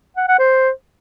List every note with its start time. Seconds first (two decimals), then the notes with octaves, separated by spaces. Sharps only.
0.17 F#5
0.28 F#5
0.39 C5